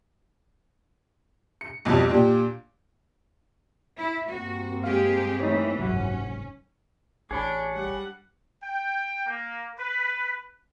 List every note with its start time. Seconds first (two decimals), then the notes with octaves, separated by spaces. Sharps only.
1.61 C#7
1.85 B1 F2 G3
2.09 A#2 D4 G4
3.97 E4
4.30 G2 A#3 C4 F#4
4.84 G#3 G4 G#4 F5
5.40 E3 A3 D#4 C#5
5.79 F#1 C2 G#2 F#3 C#4 F#5
7.31 A1 D4 G#4 C#5 B5
7.73 G3 F#5
8.63 G5
9.26 A#3
9.78 B4